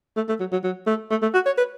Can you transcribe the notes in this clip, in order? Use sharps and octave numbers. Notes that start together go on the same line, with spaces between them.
A3
A3
F#3
F#3
F#3
A3
A3
A3
F#4
C#5
B4